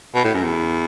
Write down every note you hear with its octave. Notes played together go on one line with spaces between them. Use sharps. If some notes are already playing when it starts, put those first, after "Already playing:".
B2
A2
F#2
E2